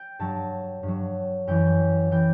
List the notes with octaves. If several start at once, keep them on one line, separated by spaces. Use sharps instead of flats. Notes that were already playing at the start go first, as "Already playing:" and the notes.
Already playing: G5
G2 F#3 A5
G2 F#3
F#2 E3 G5
E3 G5